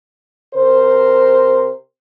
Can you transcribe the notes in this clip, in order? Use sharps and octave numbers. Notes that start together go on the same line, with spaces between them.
C3 A#4 C5